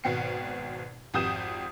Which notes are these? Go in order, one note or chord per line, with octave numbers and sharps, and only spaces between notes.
G#1 G#2 B2 G5 C7 C#7
G#1 F2 G4 D#6 G6 E7